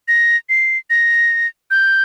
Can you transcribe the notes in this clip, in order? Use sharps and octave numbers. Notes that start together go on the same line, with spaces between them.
A#6
C7
A#6
G6